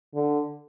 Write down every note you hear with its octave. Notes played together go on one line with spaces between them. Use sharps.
D3